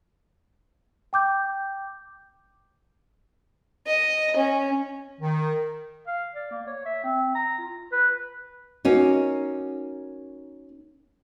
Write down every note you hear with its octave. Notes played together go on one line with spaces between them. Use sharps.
G5 D6 G6
D#5
C#4
D#3
F5
D5
A#3
C#5
E5
C4
A#5
F4
B4
A#3 C#4 D#4 F#4